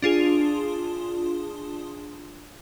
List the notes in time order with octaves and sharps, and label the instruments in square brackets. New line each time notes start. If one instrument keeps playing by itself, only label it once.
[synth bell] D4 F4 G#4